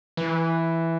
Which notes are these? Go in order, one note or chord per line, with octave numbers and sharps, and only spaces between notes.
E3